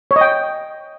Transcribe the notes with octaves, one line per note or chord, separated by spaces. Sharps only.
C#5
D#5
G5